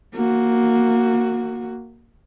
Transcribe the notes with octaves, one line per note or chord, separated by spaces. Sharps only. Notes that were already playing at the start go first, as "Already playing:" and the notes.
A#3 F#4